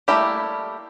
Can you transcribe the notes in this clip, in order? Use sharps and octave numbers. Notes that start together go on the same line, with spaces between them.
G3 A3 A#3 E4 G4